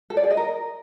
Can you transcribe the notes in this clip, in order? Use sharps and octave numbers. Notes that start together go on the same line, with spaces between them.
A4
D5
G#4
D#5
A#4